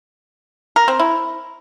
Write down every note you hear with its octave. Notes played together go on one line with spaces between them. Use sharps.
A#4
C4
E4